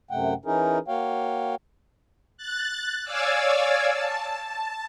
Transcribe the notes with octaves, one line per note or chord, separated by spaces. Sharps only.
F#2 C3 A3 F#5 G5
E3 C#4 D#4 E4 G#4 A#4
A#3 F#4 C#5 F5 G5
F#6 A6
C#5 D5 F5 G#5 D6 E6
A5
A5